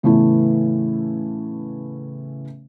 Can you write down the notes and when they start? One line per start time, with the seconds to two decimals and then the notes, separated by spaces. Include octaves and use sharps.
0.03 A2 C#3 E3 A3 B3 E4